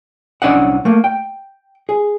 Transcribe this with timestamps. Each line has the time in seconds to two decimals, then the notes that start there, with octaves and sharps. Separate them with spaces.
0.42 C2 C#4 D4 C#5 D#5 F#5
0.85 A3 A#3
1.04 G5
1.89 G#4